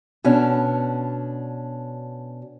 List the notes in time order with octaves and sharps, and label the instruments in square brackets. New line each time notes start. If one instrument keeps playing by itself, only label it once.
[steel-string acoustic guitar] B2 C#4 D4